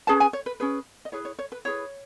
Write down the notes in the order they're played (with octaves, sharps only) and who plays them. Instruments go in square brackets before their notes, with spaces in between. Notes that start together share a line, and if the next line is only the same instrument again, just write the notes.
[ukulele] C#4 G#4 B4 A5
G#5
C#5
B4
C#4 G#4 B4
D#5
E4 G#4 B4 C#5
C#5
C#5
B4
E4 G#4 B4 C#5